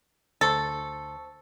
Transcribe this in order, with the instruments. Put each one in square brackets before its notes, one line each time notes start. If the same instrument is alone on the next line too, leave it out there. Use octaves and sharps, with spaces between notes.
[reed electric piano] D2 C5 C#6 [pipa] A4